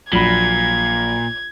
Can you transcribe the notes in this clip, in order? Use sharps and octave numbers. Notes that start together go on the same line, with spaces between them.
A#1 A#2 F#3 B5 G#6